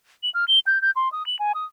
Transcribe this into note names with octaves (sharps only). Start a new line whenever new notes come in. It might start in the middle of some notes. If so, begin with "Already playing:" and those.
F#7
F6
G7
G6
G6
C6
D#6
F#7
G#5
D#6